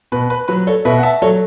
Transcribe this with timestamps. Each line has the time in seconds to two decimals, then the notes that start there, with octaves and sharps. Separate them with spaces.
0.12 B2 B4
0.30 B4
0.48 F#3 B4
0.67 A4 C#5
0.85 B2 B4 E5
0.98 F#5
1.03 E5 A5
1.22 F#3 A4 C#5